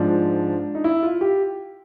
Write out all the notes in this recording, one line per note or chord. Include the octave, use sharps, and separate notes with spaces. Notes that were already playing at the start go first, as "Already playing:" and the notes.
Already playing: G#2 F3 D4
D#4
E4
F4
G4